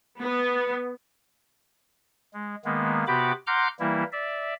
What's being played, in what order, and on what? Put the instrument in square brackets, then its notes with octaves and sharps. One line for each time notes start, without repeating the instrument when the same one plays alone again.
[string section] B3
[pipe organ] G#3
D#3 G#3 A#3 B3
C3 B3 F#4 G4 B5 D6
F#5 A#5 C6 D6 F6 G6
E3 G3 A#3 E4
D5 E5